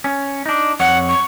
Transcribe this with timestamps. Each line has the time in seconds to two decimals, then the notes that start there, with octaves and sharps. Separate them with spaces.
0.04 C#4
0.46 D4 D#4
0.80 F2 C#5 F#5
1.08 C#6